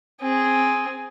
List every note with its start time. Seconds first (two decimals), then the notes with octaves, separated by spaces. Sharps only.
0.22 C4 G#4